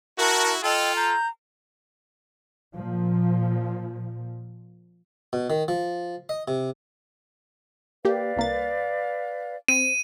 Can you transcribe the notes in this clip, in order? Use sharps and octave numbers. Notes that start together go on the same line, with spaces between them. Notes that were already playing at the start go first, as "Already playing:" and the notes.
E4 F#4 A#4 F#5 A5
F4 A4 D#5 G5
A#5 G6
A#2 F3
B2
D#3
F3
D#5
C3
A#3 G4 B4 D5 F5
C2 A#3 A6
C4 D#7